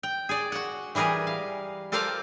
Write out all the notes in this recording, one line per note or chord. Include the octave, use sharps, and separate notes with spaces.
G5
G#4 D5
F#4 F#5
E3 G3 G#4 A#4 B4
F5
F4 A4 A#4 C5 D5 F5